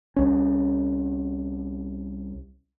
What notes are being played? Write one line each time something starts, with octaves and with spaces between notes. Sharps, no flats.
C2 C#4